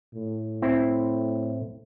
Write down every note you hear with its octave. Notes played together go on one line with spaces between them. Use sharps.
A2
C4 E4